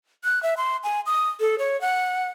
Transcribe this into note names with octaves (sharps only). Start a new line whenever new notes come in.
F#6
E5
C6
G#5
D#6
A4
C#5
F#5